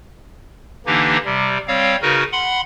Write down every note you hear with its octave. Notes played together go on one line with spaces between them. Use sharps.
D3 E3 A#3 D4 D#4 G4
C3 G3
G3 C4 C#5 F5
C#3 D#4 F#4 A#4 B4
F#5 B5 C6